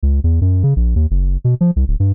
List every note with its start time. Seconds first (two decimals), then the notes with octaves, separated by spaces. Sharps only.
0.03 C#2
0.24 E2
0.41 F#2
0.63 C#3
0.76 A#1
0.96 D#2
1.11 F#1
1.44 B2
1.61 F3
1.76 C2
1.88 D1
2.00 G2